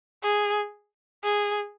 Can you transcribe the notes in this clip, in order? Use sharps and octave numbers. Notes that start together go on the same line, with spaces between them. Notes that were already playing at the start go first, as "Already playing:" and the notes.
G#4
G#4